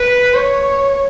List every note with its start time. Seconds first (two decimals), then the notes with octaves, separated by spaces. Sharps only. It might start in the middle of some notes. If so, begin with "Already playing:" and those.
Already playing: B4
0.35 C#5